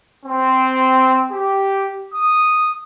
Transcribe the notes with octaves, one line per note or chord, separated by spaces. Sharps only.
C4
G4
D#6